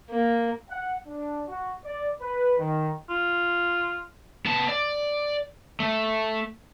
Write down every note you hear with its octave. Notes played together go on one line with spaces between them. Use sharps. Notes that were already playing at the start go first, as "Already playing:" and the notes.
A#3
F#5
D4
F#4
D5
B4
D#3
F4
B3 A5
D5
A3